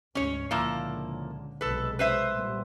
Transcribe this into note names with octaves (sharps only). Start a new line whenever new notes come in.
D2 G#2 C#4 C#5
C#2 A#2 D3 F3 A#3 E4
B1 C3 G#3 A4 B4
B4 C5 E5
A#2 G3 B3